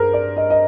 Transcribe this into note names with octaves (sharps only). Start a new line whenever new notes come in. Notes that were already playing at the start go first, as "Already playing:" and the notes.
Already playing: G2 G#4 A#4 C5
D5
D#5
D#5